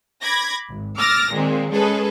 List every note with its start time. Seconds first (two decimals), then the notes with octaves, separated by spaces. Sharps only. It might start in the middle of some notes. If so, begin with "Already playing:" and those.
0.21 B5 D6 G#6 A#6
0.69 G#1
0.97 D6 E6 F6 A6 A#6
1.32 A#2 D#3 G#3 C4
1.72 G#3 C#4 G#4 A4 B4